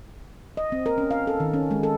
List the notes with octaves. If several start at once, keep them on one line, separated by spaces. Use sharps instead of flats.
D#5
C4
A#4
C#4
F5
A4
D#3
C#4
G#3
A4